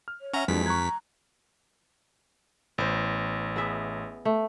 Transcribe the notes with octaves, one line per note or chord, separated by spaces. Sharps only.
F6
C#5
C#4 E5 F#5 A#5
F2 E3 F#3 G#3 D4 B6
A#5 C#6 F#6 G#6
A1 B3 C5
B3 G#4 E5
A3